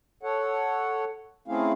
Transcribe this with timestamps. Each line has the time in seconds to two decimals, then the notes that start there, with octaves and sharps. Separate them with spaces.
0.23 A4 C#5 F#5
1.48 A3 C4 C#4 E4 G#4 F5